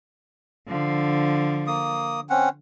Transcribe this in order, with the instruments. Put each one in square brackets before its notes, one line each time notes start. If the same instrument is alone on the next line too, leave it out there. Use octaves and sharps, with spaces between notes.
[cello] D3 F3
[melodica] A#3 D#6
C4 C#4 F#5